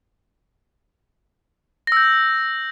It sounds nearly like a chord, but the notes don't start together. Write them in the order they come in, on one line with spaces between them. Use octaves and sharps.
A#6 E6 G6